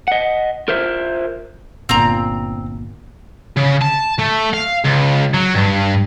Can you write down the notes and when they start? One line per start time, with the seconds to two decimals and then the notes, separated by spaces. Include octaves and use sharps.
0.08 D#5 F#5
0.68 F4 A#4 C5 E5
1.89 G1 A#2 C4 A#5
3.56 C#3
3.81 A5
4.19 A3
4.53 F5
4.84 C#2
5.34 F#3
5.55 G2